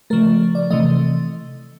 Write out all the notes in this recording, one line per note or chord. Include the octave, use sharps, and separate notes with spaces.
C#3 F3 A3 A#4
D5
C3 E3 A3 D#5